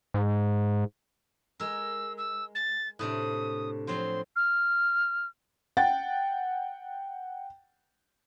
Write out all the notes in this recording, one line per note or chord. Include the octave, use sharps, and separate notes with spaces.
G#2
G#3 A#4 E6
E6
A6
A2 C3 D4 D#6
F3 F#3 C4 C6
F6
F#5 G5 A6